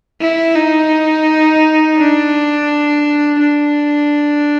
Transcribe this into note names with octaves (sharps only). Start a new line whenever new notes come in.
E4
D#4
D4
D4